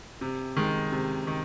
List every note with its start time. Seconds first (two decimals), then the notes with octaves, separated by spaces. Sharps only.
0.21 C3
0.57 D#3 G#3
0.92 C3
1.27 D#3